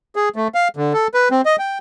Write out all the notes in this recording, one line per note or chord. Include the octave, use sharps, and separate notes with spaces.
G#4
A3
F5
D3
A4
B4
C4
D#5
G5